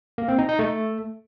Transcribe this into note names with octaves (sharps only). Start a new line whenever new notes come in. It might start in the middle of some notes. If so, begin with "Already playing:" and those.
A#3
C4
D#4
D#4
A3